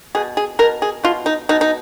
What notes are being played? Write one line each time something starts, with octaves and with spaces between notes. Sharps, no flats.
B2 G#4
G#4
B2 A#4
G#4
B2 F4
D#4
B2 D#4
D#4